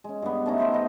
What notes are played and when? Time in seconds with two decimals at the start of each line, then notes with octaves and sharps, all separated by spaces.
0.04 G#3 C#4
0.22 G2 B3
0.46 A3 C#4 D#4
0.58 B3 C5 E5
0.72 B4 D#5 G5